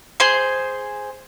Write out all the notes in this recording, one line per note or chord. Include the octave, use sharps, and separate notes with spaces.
G#4 C5 C6